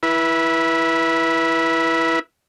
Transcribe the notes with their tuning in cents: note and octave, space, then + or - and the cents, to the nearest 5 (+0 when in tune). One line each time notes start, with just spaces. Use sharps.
E4 +0 B4 -25